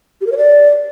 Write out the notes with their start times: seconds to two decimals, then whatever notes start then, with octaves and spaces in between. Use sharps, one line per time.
0.21 G4
0.27 A#4
0.32 C#5
0.37 D5